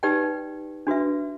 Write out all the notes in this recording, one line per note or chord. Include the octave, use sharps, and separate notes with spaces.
D#4 G4 B4 D5 G5
D4 F#4 B4 E5